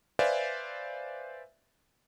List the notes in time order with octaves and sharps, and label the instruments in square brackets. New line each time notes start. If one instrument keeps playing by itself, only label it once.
[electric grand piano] B4 C5 D5 E5 F5 G#5